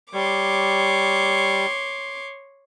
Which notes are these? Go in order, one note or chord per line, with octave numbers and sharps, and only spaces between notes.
G3 C#5 C6 D6